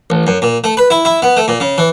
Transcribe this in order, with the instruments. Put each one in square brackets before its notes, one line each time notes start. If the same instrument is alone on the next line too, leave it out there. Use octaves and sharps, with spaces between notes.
[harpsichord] A1
F#2
A#2
A3
B4
E4
E4
B3
A3
A#2
C#3
E3